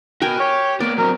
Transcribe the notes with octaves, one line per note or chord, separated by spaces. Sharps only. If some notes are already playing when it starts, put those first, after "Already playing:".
F#4 A#4 B4 G5 G#5
G4 C#5
A#3 B3 D5
F#3 C4 A#4